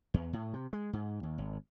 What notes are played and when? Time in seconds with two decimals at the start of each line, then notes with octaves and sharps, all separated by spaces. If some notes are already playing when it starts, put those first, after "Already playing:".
0.14 E2
0.33 A2
0.53 C3
0.73 G#3
0.93 G#2
1.23 D#2
1.38 G#1